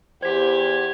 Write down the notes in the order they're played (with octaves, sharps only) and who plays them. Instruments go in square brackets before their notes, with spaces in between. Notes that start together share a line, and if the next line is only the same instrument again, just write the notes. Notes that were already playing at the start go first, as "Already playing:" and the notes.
[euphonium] E2 [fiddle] G4 [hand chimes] C5 B6 [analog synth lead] G#6